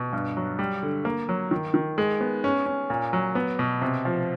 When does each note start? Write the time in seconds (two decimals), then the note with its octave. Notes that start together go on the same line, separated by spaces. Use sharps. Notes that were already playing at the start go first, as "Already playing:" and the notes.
Already playing: B2
0.13 G2
0.37 F#3
0.59 G3
0.83 D3
1.05 A#3
1.29 F#3
1.51 D#3
1.74 D#3
1.98 G#3
2.21 B3
2.44 C#4
2.66 C#4
2.90 A#2
3.13 F#3
3.35 B3
3.59 B2
3.81 C3
4.05 F3